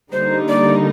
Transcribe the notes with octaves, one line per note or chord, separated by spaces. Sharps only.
D3 G3 A#3 D#4 C5
D5